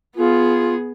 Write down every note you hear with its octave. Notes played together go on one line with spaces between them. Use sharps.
B3 F4 G#4